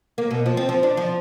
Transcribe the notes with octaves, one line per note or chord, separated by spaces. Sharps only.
A#3
B2
F3
C4
F3
D4
F3